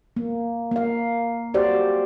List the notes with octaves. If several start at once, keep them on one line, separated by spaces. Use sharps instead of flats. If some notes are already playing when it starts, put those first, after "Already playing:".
A#3
A#3 F5
F#4 G4 C5 D5